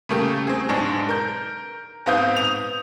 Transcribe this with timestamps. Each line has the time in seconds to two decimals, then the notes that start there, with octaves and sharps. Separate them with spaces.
0.09 C#3 G3 A3 A#3 G4
0.47 C4 G#4
0.69 B1 G#2 G#3 D4 C#6
1.09 A#4 G6
2.06 G#2 B3 C4 F5 D#6 G6
2.36 D#6 F7